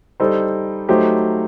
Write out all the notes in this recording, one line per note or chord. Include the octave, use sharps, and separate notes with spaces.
G3 D#4 A4 C5
F#3 A3 D#4 G4 C5